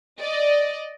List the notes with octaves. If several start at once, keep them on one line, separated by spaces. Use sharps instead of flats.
D5 D#5